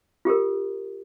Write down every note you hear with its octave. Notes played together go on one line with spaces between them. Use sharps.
F4 G4 A4 A#4